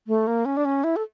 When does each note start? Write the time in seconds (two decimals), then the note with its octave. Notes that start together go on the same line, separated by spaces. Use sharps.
0.07 A3
0.27 A#3
0.45 C#4
0.57 D4
0.65 C#4
0.84 E4
0.96 A4